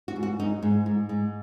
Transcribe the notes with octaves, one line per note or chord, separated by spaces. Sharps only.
F#4
G#2
F#4
G#2 D#4
G#2
G#2
G#2